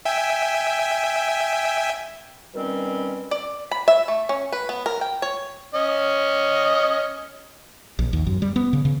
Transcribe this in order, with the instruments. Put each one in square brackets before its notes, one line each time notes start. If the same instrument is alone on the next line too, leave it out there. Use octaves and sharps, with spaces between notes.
[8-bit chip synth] E5 G5 G#5
[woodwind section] B2 D#3 G3 C4 C#4
[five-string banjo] D5
B5
E5
A3
C#4
B4
B3
A#4
G5
C#5
[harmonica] C#4 D#5
[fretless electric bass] A#1
D#2
F#2
G3
B3
C#3
C#3